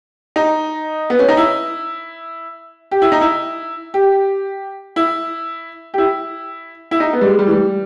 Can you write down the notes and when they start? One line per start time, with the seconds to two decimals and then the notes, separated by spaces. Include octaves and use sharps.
0.36 D#4
1.10 B3
1.19 C#4
1.28 D#4
1.37 E4
2.91 G4
3.02 E4
3.12 D#4
3.21 E4
3.94 G4
4.96 E4
5.94 G4
5.98 E4
6.91 E4
7.00 D#4
7.13 B3
7.21 G3
7.26 G#3
7.39 G3
7.47 E3
7.51 G3